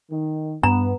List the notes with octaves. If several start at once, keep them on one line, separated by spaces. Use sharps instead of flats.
D#3
G2 B3 A#5